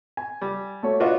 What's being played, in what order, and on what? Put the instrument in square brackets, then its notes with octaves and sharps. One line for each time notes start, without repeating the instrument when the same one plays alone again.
[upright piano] G#5
[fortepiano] G3
[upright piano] A3 F#4 C#5
[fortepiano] D4 F4 F#4 [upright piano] B4 C#5 D#5